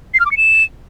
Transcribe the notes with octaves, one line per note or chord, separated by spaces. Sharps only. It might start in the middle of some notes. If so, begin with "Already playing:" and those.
C7
F6
D6
C#7
E7